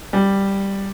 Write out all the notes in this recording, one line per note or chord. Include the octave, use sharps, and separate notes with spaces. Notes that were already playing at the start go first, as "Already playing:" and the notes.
G3